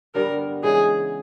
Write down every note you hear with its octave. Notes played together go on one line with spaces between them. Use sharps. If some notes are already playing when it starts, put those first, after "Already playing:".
G2 D3 G3 B3 A#4
C#3 E3 G#3 G#4